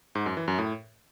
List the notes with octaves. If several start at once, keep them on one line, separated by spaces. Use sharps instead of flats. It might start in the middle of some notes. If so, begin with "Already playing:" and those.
G#2
F#2
E3
F#2
A2